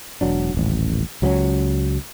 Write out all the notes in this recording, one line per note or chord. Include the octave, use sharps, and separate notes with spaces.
E1 F#3 D4
D#1 A1
C#2 F#3 G#3 C#4